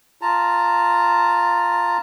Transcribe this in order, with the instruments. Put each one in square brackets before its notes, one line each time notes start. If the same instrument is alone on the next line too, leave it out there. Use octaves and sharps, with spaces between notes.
[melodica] F4 A5 A#5